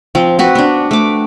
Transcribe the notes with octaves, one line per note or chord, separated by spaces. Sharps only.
F3 C4
C4 F#4 B4
B3 D4
A3 D6